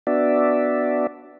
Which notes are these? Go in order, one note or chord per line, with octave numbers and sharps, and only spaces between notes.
B3 D4 F#4 D5 E5